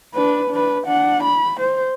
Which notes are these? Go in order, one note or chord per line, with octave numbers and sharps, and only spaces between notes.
D4 B4
D4 B4
D4 F#5
B5
C5